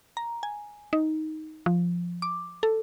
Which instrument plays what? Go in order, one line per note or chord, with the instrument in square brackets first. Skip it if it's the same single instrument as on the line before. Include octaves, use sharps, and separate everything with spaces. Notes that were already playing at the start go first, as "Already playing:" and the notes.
[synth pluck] A#5
G#5
D#4
F3
D6
A4